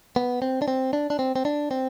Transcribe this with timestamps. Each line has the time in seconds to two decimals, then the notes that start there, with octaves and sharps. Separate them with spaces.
0.16 B3
0.42 C4
0.62 D4
0.68 C4
0.93 D4
1.10 D4
1.19 C4
1.36 C4
1.45 D4
1.71 C4